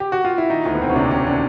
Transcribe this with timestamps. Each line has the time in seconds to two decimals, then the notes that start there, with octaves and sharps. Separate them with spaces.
0.00 G4
0.12 F#4
0.25 F4
0.38 E4
0.50 D#3 D#4
0.66 D2
0.75 B3
0.80 E1 C4
0.89 C#4
0.96 C3 D4
1.11 D#3 C#4
1.27 D4